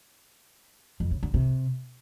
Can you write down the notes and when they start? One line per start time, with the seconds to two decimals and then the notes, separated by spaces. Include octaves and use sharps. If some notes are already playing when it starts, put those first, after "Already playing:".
1.00 F2
1.11 C#3
1.23 D3
1.34 C3